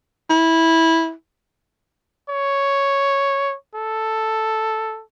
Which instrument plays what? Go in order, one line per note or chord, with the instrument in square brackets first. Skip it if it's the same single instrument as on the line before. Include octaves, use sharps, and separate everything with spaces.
[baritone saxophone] E4
[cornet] C#5
A4